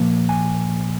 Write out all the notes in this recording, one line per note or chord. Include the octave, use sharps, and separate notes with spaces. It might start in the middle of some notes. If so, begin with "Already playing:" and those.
Already playing: A#2 F3 A#3
G#5